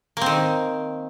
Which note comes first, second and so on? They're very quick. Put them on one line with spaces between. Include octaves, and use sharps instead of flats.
A#3 C4 D#3